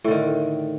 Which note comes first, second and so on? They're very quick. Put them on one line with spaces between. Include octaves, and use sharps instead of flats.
A2 D3 D#3